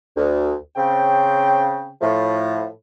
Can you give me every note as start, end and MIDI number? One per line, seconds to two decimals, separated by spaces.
0.16 0.53 38
0.76 1.89 49
0.76 1.89 60
0.76 1.89 79
2.01 2.65 45
2.01 2.65 53
2.01 2.65 57